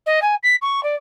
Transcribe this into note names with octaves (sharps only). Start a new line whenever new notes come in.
D#5
G#5
B6
C#6
D5